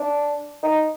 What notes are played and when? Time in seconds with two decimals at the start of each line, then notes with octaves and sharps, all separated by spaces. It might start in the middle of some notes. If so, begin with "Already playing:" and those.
Already playing: D4
0.63 D#4